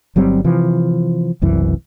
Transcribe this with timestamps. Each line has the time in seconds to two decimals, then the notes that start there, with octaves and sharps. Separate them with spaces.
0.16 G1 F#3 G3 C4
0.44 C3 E3 F3
1.42 F#1 C2 F#2 E3